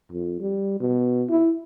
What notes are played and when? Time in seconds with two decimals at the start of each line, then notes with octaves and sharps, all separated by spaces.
0.12 F2
0.41 G3
0.80 B2
1.29 E4